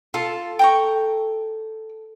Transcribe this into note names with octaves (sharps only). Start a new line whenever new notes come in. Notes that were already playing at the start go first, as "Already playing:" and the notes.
F4 A4
G5 A#5 C#6